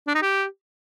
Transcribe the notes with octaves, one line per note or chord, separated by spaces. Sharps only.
D4
D#4
G4